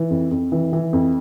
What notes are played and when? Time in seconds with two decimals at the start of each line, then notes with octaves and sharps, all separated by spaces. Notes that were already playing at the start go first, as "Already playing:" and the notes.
Already playing: E3
0.10 F2
0.31 F2
0.52 E3
0.73 E3
0.93 F2